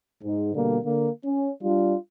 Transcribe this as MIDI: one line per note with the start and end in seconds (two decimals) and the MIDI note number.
0.23 0.50 44
0.54 0.79 47
0.54 0.79 50
0.54 0.79 55
0.54 0.79 58
0.84 1.09 50
0.84 1.09 58
1.25 1.50 61
1.62 1.95 55
1.62 1.95 62
1.62 1.95 65